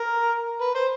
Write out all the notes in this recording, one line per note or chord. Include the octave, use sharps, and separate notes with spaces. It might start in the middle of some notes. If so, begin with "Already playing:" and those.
Already playing: A#4
B4
C5